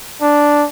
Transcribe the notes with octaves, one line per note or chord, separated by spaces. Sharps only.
D4